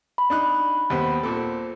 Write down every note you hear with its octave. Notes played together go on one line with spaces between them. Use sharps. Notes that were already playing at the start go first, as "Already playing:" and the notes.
B5
D4 D#4 F#6
D#2 B3 C5
A#2 C4 A4